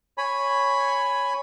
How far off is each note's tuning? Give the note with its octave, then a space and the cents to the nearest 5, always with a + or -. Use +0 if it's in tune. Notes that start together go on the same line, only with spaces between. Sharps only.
C#5 +0 G#5 +0 B5 +5